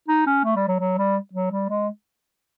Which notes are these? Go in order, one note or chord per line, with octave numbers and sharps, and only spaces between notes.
D#4
C#4
A3
G3
F#3
F#3
G3
F#3
G3
G#3